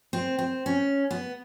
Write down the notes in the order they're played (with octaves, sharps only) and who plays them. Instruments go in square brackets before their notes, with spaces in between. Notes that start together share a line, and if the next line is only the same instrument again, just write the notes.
[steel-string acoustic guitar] C4
C4
C#4
B3